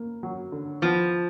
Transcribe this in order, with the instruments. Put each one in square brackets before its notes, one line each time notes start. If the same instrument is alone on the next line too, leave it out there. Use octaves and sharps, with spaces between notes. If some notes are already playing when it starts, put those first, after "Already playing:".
Already playing: [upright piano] A#3
F#3
D3
[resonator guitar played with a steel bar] F3 [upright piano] B3